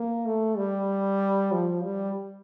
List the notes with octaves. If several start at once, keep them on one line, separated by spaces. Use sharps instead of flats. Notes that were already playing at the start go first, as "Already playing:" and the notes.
Already playing: A#3
A3
G3
F3
G3